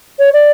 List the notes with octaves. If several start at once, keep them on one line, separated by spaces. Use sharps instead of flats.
C#5
D5